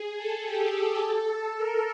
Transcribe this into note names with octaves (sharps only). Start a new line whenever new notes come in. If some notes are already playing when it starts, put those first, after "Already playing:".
Already playing: G#4
A4
G4
A4
A#4